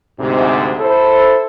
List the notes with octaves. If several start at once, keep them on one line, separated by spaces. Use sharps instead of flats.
D2 G#2 C3
E4 A4 C5